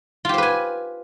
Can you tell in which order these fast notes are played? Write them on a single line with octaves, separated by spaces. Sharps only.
F4 G4 C5 B4 G#5